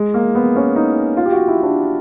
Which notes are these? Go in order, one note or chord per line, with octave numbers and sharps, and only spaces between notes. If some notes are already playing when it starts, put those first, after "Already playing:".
Already playing: G#3
A#3
B3
C#4
D#4
F4
G4
F#4
E4
D4